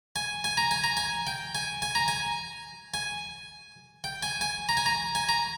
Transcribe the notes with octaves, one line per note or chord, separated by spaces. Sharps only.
G#5
G#5
A#5
G#5
A#5
G#5
G5
G#5
G#5
A#5
G#5
G#5
G5
G#5
G#5
A#5
G#5
A#5
G#5
A#5